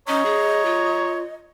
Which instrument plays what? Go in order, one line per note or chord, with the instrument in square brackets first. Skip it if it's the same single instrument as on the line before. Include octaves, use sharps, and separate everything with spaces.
[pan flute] C#4 [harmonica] C#5 A#5 [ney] D#5
[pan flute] G#4
F4